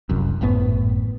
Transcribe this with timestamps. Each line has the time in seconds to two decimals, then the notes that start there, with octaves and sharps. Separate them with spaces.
0.09 F1 C2 F#2
0.41 G#1 F#2 A2 B3